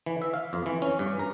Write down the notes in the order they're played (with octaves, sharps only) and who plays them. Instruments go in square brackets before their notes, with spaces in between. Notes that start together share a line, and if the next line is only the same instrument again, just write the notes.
[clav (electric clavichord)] E3
E5
F5
F2
E3
C#4
G2
A#4